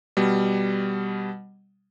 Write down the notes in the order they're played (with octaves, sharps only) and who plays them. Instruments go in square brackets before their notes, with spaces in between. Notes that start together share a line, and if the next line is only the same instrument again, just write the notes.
[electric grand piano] B2 G3